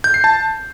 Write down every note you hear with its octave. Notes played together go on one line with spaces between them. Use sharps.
G6
C7
A5